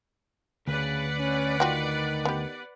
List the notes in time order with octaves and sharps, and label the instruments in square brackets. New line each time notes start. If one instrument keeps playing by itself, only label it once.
[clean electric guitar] D2 [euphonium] C#3 [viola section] B4 D5 F#5
[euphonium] C#4
[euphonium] D#3 [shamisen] F4 F#4 G5
[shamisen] B3 G4